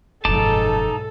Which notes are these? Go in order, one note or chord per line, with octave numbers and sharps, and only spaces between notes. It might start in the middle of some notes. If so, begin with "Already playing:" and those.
F#1 B1 G#2 F3 D#4 A4 A5 D6